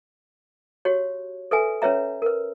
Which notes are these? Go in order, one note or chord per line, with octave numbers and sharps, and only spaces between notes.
F#4 G4 C#5
A4 B4 E5 G#5
C#4 B4 C#5 E5 A#5
A#4 B4